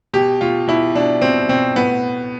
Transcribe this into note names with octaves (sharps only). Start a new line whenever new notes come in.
B2 G4
B2 F4
B2 E4
B2 D4
B2 C4
B2 C4
A2 B3